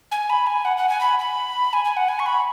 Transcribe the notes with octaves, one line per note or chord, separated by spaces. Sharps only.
G#5
B5
G#5
F#5
F#5
G#5
B5
B5
G#5
G#5
F#5
G#5
C#6
B5